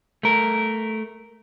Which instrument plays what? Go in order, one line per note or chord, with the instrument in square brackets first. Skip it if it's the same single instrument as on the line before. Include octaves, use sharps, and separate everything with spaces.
[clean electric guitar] A3 A#4